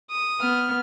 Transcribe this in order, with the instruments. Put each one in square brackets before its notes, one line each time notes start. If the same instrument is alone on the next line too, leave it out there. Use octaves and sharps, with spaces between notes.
[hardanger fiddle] D#6
[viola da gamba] B3 [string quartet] F6